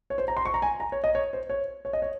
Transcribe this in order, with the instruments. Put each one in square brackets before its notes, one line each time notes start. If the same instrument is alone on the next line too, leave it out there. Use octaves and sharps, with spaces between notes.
[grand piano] C#5
C5
A#5
C6
C#6
A#5
G#5
A#5
C#5
D#5
C#5
C5
C#5
C#5
D#5
C#5